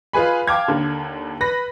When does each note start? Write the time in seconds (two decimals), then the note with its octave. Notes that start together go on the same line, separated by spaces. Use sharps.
0.13 F4 G#4 B4 G#5 B5
0.47 F5 G5 A5 D6 F6 G#6
0.68 D#2 D3
1.41 B4 B5 A#6